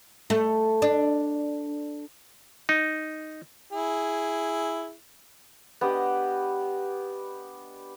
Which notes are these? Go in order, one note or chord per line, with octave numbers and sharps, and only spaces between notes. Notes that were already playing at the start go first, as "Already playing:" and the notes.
A3
D4
D#4
E4 G#4
B3 D4 G4 D#5